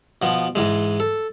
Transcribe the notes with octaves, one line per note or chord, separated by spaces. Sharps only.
B2 F3 B3
G#2 E3 G#3
A4